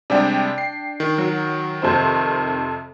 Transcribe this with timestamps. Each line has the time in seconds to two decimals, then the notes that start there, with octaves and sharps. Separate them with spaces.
0.10 C3 G3 G#3 D4 G5
0.58 C7
1.00 D#3
1.18 F#3
1.82 F2 C3 C5